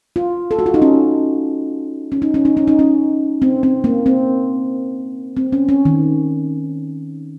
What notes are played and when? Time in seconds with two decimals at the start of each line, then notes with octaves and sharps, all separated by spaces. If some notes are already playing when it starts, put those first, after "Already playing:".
0.16 F4
0.51 A4
0.59 F#4
0.66 F4
0.74 D#4
0.82 C#4
2.12 C#4
2.22 D#4
2.34 C#4
2.45 D#4
2.57 C#4
2.68 D#4
2.79 C#4
3.42 C4
3.63 C4
3.84 A#3
4.06 C4
5.36 C4
5.52 C#4
5.69 C#4
5.85 D#3